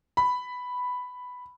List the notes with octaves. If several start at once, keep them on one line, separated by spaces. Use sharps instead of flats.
B5